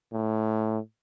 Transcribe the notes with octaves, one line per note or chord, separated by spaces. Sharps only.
A2